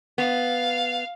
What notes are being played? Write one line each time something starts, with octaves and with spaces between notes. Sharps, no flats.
B3 F5